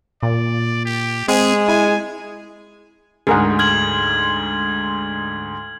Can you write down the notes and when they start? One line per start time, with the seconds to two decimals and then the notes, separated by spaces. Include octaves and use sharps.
0.23 A#2 D5
0.86 G4
1.28 G#3 C4 G#4
1.68 E4 G#5
3.27 D2 G#2 G#4 A#4 F#5
3.59 F6 G#6 F#7